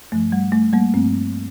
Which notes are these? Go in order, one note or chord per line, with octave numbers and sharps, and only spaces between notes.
G2 F3 A3
G3
A3
G3 A#3
G2 F3 A3 C4